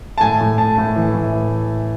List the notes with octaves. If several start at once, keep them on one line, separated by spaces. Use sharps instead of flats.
A5
A2 G#5
A2
A2 A5
A2
E3
A2
E3